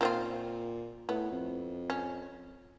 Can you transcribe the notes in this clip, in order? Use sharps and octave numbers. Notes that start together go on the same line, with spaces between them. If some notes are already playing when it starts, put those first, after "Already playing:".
A#2 D#3 C4 F4
A2 B3
F2
C#4